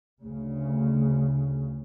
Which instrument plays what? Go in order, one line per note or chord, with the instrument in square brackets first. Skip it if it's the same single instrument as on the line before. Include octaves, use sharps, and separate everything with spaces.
[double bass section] D2 C#3